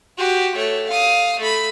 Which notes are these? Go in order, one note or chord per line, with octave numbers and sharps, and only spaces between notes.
F#4 G4
A3 C#5
F5 D#6
A3 B5